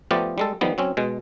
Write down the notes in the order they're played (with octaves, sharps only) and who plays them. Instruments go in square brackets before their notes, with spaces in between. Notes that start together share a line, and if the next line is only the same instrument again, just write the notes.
[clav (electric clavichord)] F3 A3 B3 F4 G4 D5
G3 G#3 A4
D#3 F3 G3 B3
F#3 C4 C#4
B2 G#3